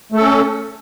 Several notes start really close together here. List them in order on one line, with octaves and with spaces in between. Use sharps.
A3 A4 C#4